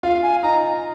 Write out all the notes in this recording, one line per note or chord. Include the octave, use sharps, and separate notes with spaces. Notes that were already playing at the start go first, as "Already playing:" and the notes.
F4 F5
G#5
D#4 A#5